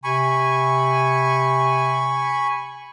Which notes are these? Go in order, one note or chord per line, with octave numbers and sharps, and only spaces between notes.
C3 G#5 B5 C#6